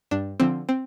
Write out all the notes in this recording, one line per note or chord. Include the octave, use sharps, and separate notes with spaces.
G2 D4
D3 F3 C4
C4